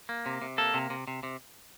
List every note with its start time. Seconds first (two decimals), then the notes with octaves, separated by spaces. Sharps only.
0.09 A#3
0.26 C3
0.42 C3
0.58 A#3 A4
0.74 C3
0.90 C3
1.07 C3
1.23 C3